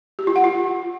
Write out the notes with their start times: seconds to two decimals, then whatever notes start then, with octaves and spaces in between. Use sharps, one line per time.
0.19 G4
0.27 F4
0.36 F#5
0.44 F4